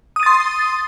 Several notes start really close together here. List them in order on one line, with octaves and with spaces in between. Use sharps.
D#6 D#7 A6 C6